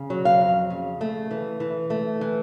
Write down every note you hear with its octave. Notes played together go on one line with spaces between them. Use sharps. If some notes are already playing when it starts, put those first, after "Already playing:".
Already playing: C#3
F#3
F5
F2
C#3
A3
E3
E3
A3
E3